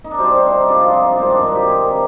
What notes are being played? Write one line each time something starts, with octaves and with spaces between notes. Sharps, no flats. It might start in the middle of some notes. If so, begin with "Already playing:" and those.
D#4
D4
C3 G3 C4
C4
D#4
C3 F3 G#3 D4
F4
D#4
D4
G2 D#3 G#3 C4
D4
D#4
G4
C3 G3 G#4
A#4